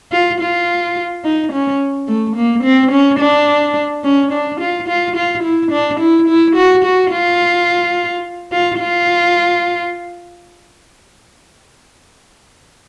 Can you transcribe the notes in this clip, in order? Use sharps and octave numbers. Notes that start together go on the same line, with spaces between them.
F4
F4
D#4
C#4
A3
A#3
C4
C#4
D4
C#4
D4
F4
F4
F4
E4
D4
E4
E4
F#4
F#4
F4
F4
F4